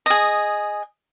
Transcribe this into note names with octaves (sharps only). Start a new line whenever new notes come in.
G#4 D#5